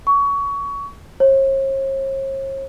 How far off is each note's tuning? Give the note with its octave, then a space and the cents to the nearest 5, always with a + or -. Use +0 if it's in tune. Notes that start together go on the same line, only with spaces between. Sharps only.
C#6 +25
C#5 -45